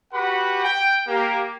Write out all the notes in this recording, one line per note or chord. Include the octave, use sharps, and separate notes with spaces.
F#4 G4 B4 F#5 B5
G5
A#3 G4